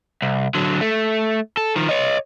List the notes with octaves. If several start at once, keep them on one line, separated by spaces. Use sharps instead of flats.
C2
D3 F#3
A3
A4
D#3 F3
C#5 D#5